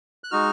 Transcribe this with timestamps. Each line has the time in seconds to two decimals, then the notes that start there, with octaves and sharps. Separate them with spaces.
0.24 F#6
0.31 G#3 D#4 F#4 F6